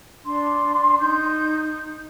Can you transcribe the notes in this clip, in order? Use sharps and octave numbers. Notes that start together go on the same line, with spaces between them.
D4 C6
D#4 G6